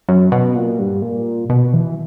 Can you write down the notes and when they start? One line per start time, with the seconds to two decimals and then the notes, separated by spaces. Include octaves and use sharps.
0.09 F#2
0.32 B2
0.55 A#2
0.79 G2
1.02 A#2
1.50 B2
1.74 E3